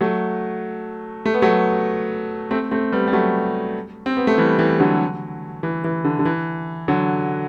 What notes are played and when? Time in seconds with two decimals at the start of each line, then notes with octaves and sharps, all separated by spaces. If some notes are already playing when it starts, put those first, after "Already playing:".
0.01 F#3 A3
1.26 A3
1.34 B3
1.42 F#3 A3
2.51 A3 C4
2.71 A3 C4
2.92 G3 B3
3.08 G3
3.13 F#3 A3
4.06 C4
4.17 B3
4.27 A3
4.38 E3 G3
4.59 E3 G3
4.80 D3 F#3
5.63 E3
5.84 E3
6.04 D3
6.19 D3
6.25 E3
6.88 D3 F#3